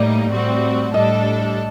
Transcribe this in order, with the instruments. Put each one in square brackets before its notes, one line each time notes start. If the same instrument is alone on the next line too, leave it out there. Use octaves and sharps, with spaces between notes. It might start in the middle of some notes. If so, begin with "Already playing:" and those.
Already playing: [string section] A2 G3 A#3 D#4 [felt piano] D5
[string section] A2 G3 C4 F#4
[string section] A2 G3 D4 A4 [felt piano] D#5